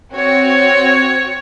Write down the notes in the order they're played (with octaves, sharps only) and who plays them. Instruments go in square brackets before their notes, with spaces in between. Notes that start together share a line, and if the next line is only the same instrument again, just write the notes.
[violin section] C4 F#4 C#5